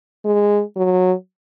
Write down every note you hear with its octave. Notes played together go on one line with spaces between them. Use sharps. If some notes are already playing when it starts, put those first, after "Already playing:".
G#3
F#3